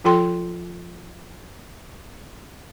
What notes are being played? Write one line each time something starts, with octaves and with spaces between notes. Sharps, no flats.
F3 F4 A4 G5 C6